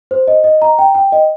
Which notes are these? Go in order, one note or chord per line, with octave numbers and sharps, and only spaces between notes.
C5
D#5
D#5
A#5
G5
G5
D#5